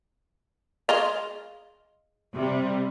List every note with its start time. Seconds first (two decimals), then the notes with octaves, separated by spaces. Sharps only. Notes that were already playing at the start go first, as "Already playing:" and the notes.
0.89 G#3 D#5 F5
2.34 C3 G3